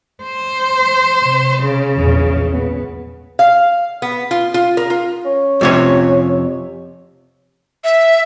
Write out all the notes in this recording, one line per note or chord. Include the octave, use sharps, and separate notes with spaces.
C5
C3
C#3
A#1 E2
B3
F5
B3
F4
F4
A#4
F4
C#4
F2 C3 C#5
E5